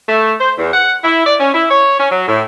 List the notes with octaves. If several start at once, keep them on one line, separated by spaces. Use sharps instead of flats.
A3
C5
E2
F#5
E4
D5
C#4
E4
C#5
C#4
F#3
A2